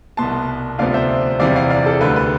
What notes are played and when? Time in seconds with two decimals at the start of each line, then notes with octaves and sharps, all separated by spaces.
0.17 C2 B2 B3 A5 C6
0.78 D2 C3 F3 B3 D5 F5
0.94 C5 E5
1.40 E2 C3 E3 G3 D5 F5
1.56 D5 F5
1.70 D5 F5
1.86 A4
2.01 D2 D3 G3 B4
2.16 B4